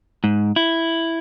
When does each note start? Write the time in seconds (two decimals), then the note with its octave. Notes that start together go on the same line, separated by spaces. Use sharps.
0.24 G#2
0.56 E4